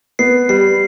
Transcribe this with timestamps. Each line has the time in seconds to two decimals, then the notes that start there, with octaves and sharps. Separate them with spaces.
0.19 B3 C7
0.49 G3 C7